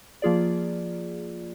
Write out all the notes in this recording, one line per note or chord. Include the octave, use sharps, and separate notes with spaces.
F3 A#3 F4 G#4 D5